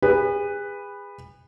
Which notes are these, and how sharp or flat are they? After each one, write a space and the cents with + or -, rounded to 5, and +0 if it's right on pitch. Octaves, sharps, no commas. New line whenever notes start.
G#4 -35 B4 +0